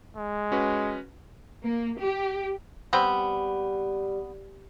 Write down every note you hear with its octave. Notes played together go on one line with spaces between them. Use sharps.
G#3
C#4 F#4 B4
A#3
G4
G3 B3 C4 G5